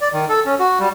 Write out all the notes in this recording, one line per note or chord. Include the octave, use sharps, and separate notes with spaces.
D5
D#3
A4
C#4
F#4
G3